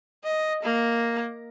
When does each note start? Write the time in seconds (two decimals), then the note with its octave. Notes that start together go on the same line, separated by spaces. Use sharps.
0.24 D#5
0.63 A#3